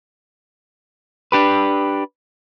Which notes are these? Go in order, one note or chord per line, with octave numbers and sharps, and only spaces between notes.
D4 G4 B4